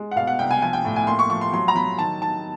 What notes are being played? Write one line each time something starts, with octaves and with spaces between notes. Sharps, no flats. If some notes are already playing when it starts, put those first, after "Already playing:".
Already playing: G#3
F#5
B2 F5
F#5
C2 G5
G#5
F3 G#5
G5
A2
G#5
A#3 C6
C#6
F3 C#6
C6
F#3 C6
A#5
F#3 B5
D#3 A5
D#3 A5